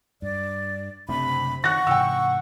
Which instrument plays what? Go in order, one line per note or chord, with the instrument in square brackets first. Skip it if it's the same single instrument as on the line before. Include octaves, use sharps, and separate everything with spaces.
[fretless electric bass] G2 [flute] D5
[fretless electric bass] F#1 A3 D4 [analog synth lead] C3 [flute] B5
[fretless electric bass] D#3 [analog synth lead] F#5 [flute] C#6 [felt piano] F#6 A#6
[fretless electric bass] G#2 C3 E3 [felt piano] G5 E6